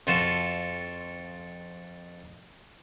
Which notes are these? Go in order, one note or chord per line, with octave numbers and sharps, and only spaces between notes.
F2 F4 F#4 A4